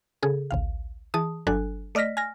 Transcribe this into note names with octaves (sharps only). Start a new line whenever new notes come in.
C#3 G#4 A4
A1 D2 F5
E3 G#4 A5 D#6
G1 F#3 D4 A4 G#5 F#6
A3 D5 D#5 F6 A#6 B6
G#5 F6 A#6